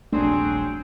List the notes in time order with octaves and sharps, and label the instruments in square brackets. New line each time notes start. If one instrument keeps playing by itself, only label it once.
[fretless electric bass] D#1 A#1 A3 [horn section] F#3 C4 G#4 [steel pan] D4